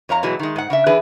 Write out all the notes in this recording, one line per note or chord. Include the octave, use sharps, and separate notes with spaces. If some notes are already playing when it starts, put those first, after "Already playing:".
F2 C#5 F5 A#5
B2 E3 F#3 G#3
D#3 G#3
G#2 F#5
C#3 D4 E5
E3 D4 G#4 B4